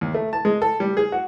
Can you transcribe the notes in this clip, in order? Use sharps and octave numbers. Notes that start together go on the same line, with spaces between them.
D#2
A3
A5
G#3
A4
G3
G#4
F#4